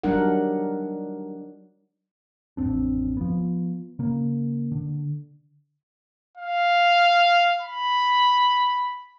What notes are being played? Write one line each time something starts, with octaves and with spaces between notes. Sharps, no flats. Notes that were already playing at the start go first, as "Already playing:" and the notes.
F#3 G3 D4 D#4 A#4 F#5
A1 F2 C4 D4
F3 B3
C#3 A#3
D3
F5
B5